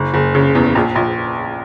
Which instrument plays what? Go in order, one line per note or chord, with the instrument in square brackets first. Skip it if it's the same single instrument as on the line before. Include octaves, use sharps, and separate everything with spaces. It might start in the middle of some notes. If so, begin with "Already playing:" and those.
Already playing: [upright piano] F#1
F#1
C#3
E2
A#1
A#1